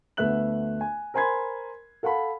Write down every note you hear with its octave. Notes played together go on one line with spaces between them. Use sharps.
D2 A3 B3 E5 F#6 F#7
G#5
A#4 C5 G#5 B5 C6 G#6
A4 F5 F#5 A5 B5